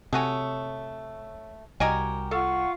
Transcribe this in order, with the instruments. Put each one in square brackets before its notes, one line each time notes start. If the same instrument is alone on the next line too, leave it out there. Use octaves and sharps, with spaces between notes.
[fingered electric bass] C3 [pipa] A3 F#4 G#5 [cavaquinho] C#5 D#6
[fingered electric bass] C2 [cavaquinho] F#4 G4 A#4 [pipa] D5 D#5 G#5
[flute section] F4 F#5 C#6 [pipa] A4 [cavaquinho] F5